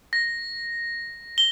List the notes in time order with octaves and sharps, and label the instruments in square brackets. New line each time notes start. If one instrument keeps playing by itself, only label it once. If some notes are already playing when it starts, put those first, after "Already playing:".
[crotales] A#6
G7